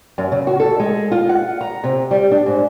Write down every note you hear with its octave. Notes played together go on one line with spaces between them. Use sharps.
F#2
C#3
F#4
A4
G#3
F4
F#5
A#5
C3
G3
D4
G#2